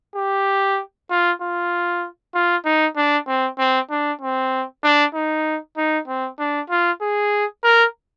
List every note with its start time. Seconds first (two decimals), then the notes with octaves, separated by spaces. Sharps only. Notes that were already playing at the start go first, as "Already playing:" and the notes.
0.16 G4
1.10 F4
1.41 F4
2.35 F4
2.65 D#4
2.96 D4
3.28 C4
3.58 C4
3.91 D4
4.21 C4
4.83 D4
5.14 D#4
5.77 D#4
6.08 C4
6.39 D4
6.70 F4
7.02 G#4
7.64 A#4